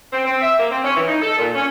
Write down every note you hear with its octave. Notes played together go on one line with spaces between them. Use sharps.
C4
C4
E5
A#3
C4
C#4
E3
D#4
A4
A#2
C#4